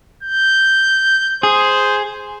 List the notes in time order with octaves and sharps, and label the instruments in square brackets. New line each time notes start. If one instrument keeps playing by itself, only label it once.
[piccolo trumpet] G6
[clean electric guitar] G#4 [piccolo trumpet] C5